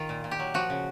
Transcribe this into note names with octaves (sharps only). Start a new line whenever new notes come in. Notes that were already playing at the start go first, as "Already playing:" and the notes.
Already playing: D#3 F4
A#2
A#2
G4
F#3
F3 F#4
C#3